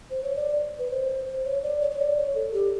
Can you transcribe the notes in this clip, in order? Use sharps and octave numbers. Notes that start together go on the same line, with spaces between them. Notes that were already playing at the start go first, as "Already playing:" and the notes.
C5
C#5
D5
B4
C5
C5
C#5
D5
C#5
C#5
D5
C#5
A4
G4